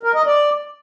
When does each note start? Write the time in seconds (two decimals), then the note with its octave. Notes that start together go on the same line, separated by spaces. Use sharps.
0.03 A#4
0.15 D#5
0.26 D5